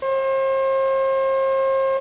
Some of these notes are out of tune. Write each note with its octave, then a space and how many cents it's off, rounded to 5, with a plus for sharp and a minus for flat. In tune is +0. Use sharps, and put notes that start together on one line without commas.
C5 +40